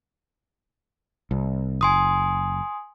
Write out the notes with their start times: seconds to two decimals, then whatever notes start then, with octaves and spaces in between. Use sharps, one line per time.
1.31 C2
1.81 F#1 G#5 C6 D#6